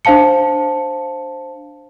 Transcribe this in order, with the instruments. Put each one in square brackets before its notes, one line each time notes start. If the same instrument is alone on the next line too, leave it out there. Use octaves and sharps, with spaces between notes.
[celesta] D4 C5 F5 A5 C#7